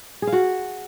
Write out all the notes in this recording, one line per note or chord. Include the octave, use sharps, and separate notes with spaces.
G#4
F5
F#4